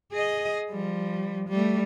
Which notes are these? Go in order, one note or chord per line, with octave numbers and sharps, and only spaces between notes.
G#4 D#5
F3 G3
G3 A3